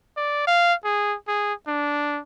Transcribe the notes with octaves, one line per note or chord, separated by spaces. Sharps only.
D5
F5
G#4
G#4
D4